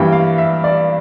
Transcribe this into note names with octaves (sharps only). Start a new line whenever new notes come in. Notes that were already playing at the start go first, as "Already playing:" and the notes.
Already playing: G2 E3 G3 A#3 G5
F5
E5
D5